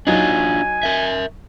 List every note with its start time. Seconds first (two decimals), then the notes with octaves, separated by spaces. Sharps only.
0.07 F#3 D4 D#4 F4 G#5
0.83 A#4 E5